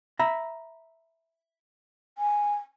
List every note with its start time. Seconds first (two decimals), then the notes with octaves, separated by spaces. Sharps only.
0.19 E5 A#5 B5
2.18 G#5